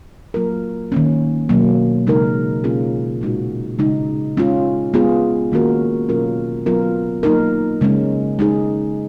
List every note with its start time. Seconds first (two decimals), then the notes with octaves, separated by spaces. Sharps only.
0.34 F#3 A#3 F4 A#4
0.92 D#3 A#3 C#4
1.49 B2 F#3 A#3
2.07 C#3 G#3 D#4 A#4
2.64 B2 A#3 C#4 F4 G#4
3.21 A#2 G#3 D#4 F#4
3.79 C#3 G#3 D#4
4.37 G#3 C#4 F4
4.94 G#3 B3 F4 G#4
5.52 D#3 A#3 C#4 F#4 A#4
6.09 B2 F#3 C#4 F4 A#4
6.66 F#3 B3 F4 A#4
7.23 F#3 A#3 D#4 A#4
7.81 C#3 G#3 C#4
8.39 G#3 D#4 G#4